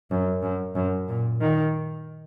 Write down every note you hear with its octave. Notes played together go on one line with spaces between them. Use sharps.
F#2
F#2
F#2
A#2
D#3